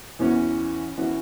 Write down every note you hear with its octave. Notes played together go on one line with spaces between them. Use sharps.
E2 E3 C#4 F#4
E3 C#4 F#4